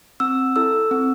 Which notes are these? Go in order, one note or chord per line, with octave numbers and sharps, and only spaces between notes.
C4 E6
E4 A4 E6
C4